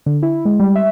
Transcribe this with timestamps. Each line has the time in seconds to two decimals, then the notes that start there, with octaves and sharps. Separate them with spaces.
0.06 D3
0.23 E4
0.45 G#3
0.60 G3
0.75 E5